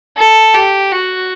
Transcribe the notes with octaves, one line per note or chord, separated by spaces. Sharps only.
A4
G4
F#4